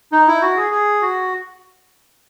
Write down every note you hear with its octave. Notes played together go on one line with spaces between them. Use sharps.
D#4
E4
F#4
G#4
G#4
F#4